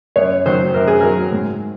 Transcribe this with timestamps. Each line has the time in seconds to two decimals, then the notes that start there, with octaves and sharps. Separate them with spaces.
0.16 F#2 C#5
0.46 D#3 F#3 C5
0.74 F#2 A#4
0.87 G#4
1.01 D#3 F#3 A#4
1.32 G#2